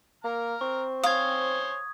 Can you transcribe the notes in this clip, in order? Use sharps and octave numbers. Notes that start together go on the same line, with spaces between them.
A#3 A#5 F6
C4 C#6
C5 C#5 F5 G#5 D#6 G#6